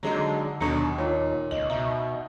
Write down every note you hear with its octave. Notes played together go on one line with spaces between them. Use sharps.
D3 F#3 G#3 D#4
D#2 B2 D3 F#3 C#7
A#2 D#4 F4 C#5
C#2 D#5 F#7
B2 D#4 E5